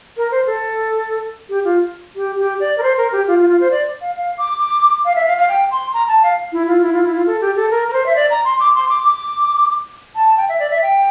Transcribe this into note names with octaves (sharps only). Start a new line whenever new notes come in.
A#4
C5
A4
G4
F4
G4
G4
D5
A#4
C5
A#4
G4
F4
F4
F4
C5
D5
F5
F5
D6
D6
F5
E5
F5
F5
G5
C6
A#5
A5
F5
E4
F4
E4
F4
E4
F4
A4
G4
A4
A#4
A#4
C5
E5
D5
A#5
C6
D6
C6
D6
D6
A5
G5
E5
D5
E5
G5